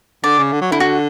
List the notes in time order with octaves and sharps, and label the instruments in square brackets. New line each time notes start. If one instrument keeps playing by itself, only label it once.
[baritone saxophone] D3 [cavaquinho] D5
[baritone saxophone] C#3
D3
F#3
[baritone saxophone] D3 [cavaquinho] E4
[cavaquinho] F#4